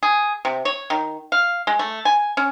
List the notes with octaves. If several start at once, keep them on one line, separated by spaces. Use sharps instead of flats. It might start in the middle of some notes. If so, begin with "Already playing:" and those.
G#4
C3
C#5
D#3
F5
G#3
A3
G#5
C#4